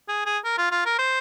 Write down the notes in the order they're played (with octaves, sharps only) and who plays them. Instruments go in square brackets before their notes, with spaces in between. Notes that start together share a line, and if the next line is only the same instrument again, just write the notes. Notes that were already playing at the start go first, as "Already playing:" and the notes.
[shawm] G#4
G#4
A#4
F4
F4
A#4
C5